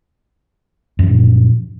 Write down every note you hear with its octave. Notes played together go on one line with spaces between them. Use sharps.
F#2 A#2 F3